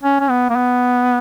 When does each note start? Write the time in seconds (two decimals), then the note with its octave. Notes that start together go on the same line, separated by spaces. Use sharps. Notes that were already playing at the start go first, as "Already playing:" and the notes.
0.03 C#4
0.20 C#4
0.30 B3
0.50 A#3
0.56 B3